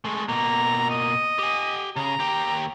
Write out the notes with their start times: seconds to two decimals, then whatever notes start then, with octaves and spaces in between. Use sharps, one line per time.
0.05 G#3 A3
0.29 B2 A#3 A#5
0.90 D#5
1.39 G4 G#5
1.96 C#3 A#5
2.20 D#2 G4